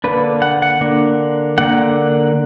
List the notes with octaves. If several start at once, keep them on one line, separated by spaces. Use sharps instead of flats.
D3 A#3 D4 B4
F#5
F#5
D3 A#3 D4
D3 A#3 D4 F#5